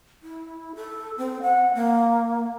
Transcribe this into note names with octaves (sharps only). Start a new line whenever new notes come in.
E4
A4
C4
F#5
A#3